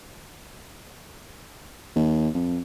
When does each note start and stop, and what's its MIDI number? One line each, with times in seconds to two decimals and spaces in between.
1.96 2.29 39
2.34 2.61 41